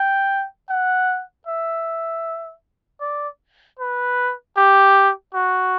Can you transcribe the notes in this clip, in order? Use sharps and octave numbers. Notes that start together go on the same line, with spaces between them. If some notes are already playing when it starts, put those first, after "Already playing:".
Already playing: G5
F#5
E5
D5
B4
G4
F#4